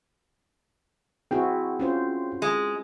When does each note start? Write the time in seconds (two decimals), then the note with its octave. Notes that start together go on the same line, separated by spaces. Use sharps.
1.31 C4 E4 F#4 G#4 G5
1.79 C#4 F4 C5
2.42 G#3